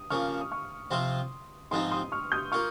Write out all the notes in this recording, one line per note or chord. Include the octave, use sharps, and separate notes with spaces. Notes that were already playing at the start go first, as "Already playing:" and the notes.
Already playing: D#6
C#3 F3 A#3 C#6 F6
D#6
C#6 F6
C3 F3 C4 F4 C6 D#6
G#2 F3 C4 D#4 C6 D#6
C6 D#6
C#6 F6
D#6 G6
A#3 F4 C#6 F6